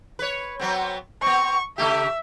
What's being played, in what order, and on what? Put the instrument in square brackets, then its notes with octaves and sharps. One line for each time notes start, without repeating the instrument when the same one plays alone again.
[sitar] B4 C#5
F#3 B3 C4
[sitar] B3 C4 [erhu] C#6
[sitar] C#3 A3 G4 [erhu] E5